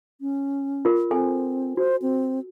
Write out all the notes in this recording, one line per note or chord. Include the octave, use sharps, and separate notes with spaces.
C#4
F4 A#4
C4 A4 G#5
F#4 C5
C4